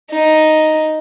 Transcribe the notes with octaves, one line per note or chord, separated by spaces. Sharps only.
D#4